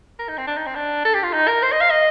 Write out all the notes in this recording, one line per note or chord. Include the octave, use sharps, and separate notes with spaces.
A#4
D#4
C4
D4
D#4
C4
D4
A4
G4
F4
D#4
A#4
C5
D#5
F5
D#5